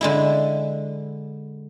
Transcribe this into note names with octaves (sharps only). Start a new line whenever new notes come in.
D3 G#3 E4